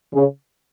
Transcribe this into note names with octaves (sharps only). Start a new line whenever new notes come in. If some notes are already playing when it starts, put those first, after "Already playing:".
C#3